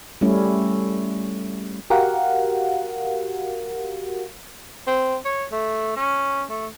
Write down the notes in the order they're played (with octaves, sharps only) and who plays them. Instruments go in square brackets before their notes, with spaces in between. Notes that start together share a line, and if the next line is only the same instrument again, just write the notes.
[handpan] G3 A3 C#4 E4
[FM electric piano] F#4 G4 A#4 F5 F#5
[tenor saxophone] C4
C#5
A3
C#4
A3